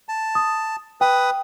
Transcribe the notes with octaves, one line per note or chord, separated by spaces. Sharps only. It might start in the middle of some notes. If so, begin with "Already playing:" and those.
A5
D#6
B4 G5 D#6